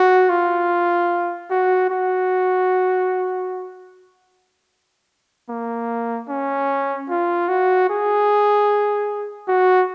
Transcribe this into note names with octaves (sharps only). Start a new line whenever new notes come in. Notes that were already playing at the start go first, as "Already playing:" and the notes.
Already playing: F#4
F4
F#4
F#4
A#3
C#4
F4
F#4
G#4
F#4